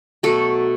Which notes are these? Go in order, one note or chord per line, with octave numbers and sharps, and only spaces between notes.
B2 F#3 A3 A4